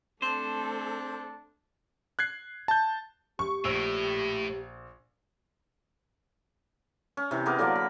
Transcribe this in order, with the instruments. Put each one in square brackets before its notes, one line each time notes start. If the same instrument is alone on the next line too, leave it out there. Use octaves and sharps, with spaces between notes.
[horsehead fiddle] A3 A4 [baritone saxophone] C4 [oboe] D4 [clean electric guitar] C5
[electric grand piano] F#6 G#6 C7
A5 G6
[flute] G4 [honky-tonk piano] C#6
[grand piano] A#1 E6 [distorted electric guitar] A2
[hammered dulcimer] C#4
C3 E3
B3 G#4 A#4 D6
D3 F#3 A#3 D5
B5